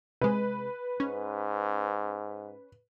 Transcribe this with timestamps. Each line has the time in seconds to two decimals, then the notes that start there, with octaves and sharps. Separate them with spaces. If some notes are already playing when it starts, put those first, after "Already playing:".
0.21 C3 G#3 B4
1.00 G#2 C#4